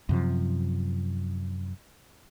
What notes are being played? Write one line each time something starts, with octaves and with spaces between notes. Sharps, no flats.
F#2 C3 F3